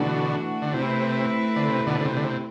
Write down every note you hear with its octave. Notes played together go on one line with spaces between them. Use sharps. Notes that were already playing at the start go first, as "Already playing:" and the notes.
Already playing: B2 D3 E3 A3 D4 F#4
D3
C3 A3 C4 E4 B4
D3
C3
B2 D3
D3
C3
D3
C3